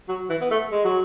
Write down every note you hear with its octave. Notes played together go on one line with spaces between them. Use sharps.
F#3
E3
B3
A3
G#3
F#3